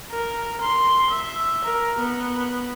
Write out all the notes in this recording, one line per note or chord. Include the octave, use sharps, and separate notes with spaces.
A#4
C6
E5
A#4
B3